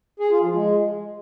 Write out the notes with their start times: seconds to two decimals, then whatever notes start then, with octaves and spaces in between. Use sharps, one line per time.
0.20 G#4
0.31 F4
0.42 F3
0.53 G#3